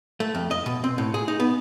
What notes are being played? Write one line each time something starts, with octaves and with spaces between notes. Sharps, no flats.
A3
F2
D#5
B2
C4
A2
G#4
D#4
B3